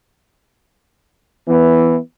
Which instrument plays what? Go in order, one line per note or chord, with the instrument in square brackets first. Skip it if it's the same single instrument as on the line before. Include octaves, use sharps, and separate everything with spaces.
[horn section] E3 [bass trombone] B3